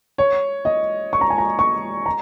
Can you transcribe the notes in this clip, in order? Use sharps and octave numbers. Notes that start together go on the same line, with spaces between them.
C#5
D#5
C#6
A#5
G#5
A#5
C#6
A#5